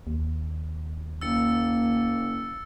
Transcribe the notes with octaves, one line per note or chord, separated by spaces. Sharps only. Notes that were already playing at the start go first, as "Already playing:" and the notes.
D#2
F#1 A#3 E6 A6 C#7